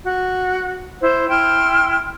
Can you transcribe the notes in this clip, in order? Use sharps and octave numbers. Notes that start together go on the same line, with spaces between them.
F#4
E4 C5
E4 G5 C6 F6